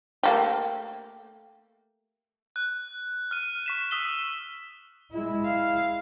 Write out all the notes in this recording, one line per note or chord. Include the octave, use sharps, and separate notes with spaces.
A3 A#3 G4
F#6
F6 D#7
C#6 B6 E7
D#6 E6 B6 G7
G#3 E4
F5